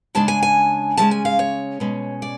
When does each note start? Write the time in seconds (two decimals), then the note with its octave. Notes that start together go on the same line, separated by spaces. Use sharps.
0.15 C#3 G#3 D4 A5
0.28 G#5
0.43 G#5
0.97 C#3 F3 G#3 C#4 A5
1.11 G#5
1.25 F5
1.39 C#5
1.80 B2 G#3 C#4
2.22 D5